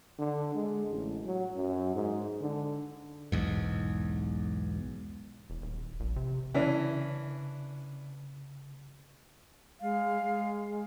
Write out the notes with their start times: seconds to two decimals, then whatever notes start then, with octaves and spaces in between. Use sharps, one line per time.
0.18 D3
0.55 G#3
0.89 A1
1.25 F#3
1.56 F#2
1.95 G#2
2.41 D3
3.32 B1 E2 G#2
5.50 E1
5.62 D#1
6.00 A#1
6.16 C3
6.54 C#3 E3 C#4 D4
9.81 G#3 F5
10.22 G#3